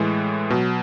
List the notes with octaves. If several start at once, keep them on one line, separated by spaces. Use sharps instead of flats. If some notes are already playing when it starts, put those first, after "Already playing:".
Already playing: A2 E3 G#3
B2 F#3